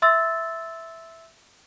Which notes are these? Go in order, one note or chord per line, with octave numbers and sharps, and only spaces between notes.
E5 C6 E6 A6